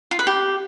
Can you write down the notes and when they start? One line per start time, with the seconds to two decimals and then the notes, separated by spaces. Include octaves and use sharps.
0.11 F4
0.19 B4
0.27 G4